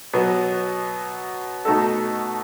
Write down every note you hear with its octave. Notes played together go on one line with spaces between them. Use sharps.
B2 F#3 B3
B2 A3 D#4 F#4 A4